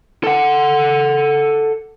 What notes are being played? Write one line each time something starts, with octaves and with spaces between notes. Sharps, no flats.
A4 F#5